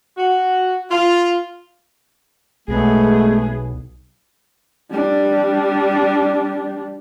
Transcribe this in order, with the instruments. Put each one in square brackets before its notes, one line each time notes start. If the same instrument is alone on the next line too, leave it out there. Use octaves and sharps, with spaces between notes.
[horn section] F#4
F4
[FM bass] B1 [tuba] G#3 [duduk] A3 [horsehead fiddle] B3 G#4
[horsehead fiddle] G3 D4